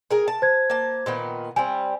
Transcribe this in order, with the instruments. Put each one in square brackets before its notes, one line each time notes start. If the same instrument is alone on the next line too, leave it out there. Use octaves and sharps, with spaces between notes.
[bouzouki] G#4 A#4 G#5
A5
[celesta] C5 G#6
[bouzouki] A#3 A5
A#2 D#3 B3
[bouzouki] G3 C4 [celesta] G#5